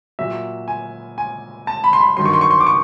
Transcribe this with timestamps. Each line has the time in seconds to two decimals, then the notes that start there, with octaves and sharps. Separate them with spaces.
0.19 A#2 F#3 E5
0.68 G#5
1.18 G#5
1.67 A5
1.84 B5
1.93 C6
2.00 B5
2.17 G2 D#3 F#3 C6
2.25 C#6
2.33 C6
2.41 C#6
2.51 C6
2.61 D6
2.67 C#6